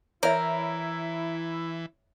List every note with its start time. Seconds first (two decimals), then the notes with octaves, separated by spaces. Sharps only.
0.23 E3 E4 A#4 C#5 D5 E5